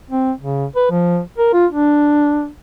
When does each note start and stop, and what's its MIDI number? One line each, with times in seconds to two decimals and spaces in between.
0.11 0.32 60
0.41 0.65 49
0.76 0.87 71
0.91 1.20 53
1.38 1.50 70
1.53 1.66 65
1.71 2.48 62